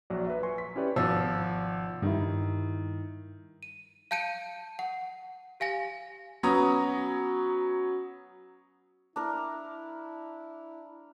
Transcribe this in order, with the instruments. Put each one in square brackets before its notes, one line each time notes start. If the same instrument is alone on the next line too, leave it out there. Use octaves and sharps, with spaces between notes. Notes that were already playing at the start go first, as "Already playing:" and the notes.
[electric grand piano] A#1 F#3 D5
B4 E5
B4 G#5 C6 C#6
B6
C#4 E4 G4 B4 D5 C#6
[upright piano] G#1 F3 E6 [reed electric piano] B2
[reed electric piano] G2 E4 [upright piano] D#3
[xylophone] D#7
F5 A5 G6 C#7 D#7
F#5
G4 F5 G#5 A#6
[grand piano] F#3 B3 C#4 A#5 D#6
[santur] D4 A#4 [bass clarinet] E4